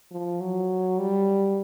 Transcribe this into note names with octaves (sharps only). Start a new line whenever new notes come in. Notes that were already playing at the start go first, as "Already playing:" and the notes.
F3
F#3
G3